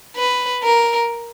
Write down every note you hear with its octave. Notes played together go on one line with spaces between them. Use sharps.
B4
A#4